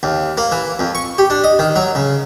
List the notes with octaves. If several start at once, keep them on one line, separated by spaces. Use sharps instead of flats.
D#2
A#3
E3
F2
C#6
G4
D4
D#5
D#3
F#3
C#3